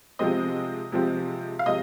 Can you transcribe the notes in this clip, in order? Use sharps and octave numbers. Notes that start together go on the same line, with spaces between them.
C3 F3 G#3 C4 D#5
C3 F3 G#3 C4
F5
C3 F3 G#3 D#5